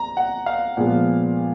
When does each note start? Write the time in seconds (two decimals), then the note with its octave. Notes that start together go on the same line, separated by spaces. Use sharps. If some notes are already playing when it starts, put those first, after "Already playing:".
Already playing: A#5
0.17 F#5
0.46 F5
0.77 A#2 F3 G#3 B3